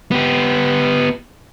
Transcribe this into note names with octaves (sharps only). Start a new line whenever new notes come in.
B3 G4